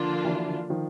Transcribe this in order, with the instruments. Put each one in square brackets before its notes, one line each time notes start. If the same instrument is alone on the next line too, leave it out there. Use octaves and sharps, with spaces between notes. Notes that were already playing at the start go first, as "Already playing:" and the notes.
Already playing: [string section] D3 F3 A#3 D4 F4
[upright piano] E3 F#3
D#3 F3